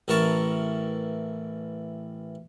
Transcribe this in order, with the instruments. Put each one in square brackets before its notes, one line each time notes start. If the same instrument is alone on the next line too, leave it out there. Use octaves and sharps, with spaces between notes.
[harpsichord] A1 E3 A#4 A5 C#6